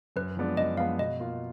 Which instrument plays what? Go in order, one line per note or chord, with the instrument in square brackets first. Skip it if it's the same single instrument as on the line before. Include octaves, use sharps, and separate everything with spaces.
[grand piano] F#2 [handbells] B4
[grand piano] F3 G#3 B3 D4
[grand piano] F#2 [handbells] D#5
[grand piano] F3 G#3 B3 D4 [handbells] F5
[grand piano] B2 [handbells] D#5
[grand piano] A#3 F4